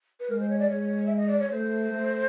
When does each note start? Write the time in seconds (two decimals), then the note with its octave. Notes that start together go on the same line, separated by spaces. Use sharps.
0.20 B4
0.29 G#3 A#4
0.40 C5
0.49 C#5
0.60 D5
0.70 G#3 C#5
1.06 E5
1.17 D#5
1.28 D5
1.40 C#5
1.51 A3 C5
1.91 A3